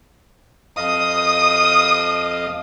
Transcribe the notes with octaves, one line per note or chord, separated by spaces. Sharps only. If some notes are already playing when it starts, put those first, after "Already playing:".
F2 D#5 F5 D#6